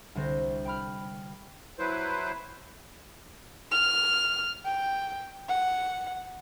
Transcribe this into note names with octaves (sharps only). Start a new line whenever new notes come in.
C2 D3 C4 C5 A#6
G5 B5 F6
F#3 E4 B4 C5
F6
G5
F#5